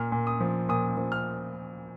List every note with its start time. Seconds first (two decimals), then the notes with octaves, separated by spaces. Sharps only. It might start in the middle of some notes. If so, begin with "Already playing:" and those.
Already playing: A#2 F6
0.12 A#2
0.27 D#6
0.40 F3
0.69 A#2 D#6
0.97 F3
1.12 F6